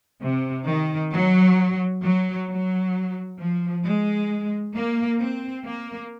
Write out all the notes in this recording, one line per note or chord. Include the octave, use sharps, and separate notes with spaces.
C3
D#3
F#3
F#3
F#3
F3
G#3
A#3
C4
A#3